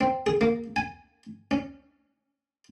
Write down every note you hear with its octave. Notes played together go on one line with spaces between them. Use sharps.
C4
G#4
A#3
G#5
C#4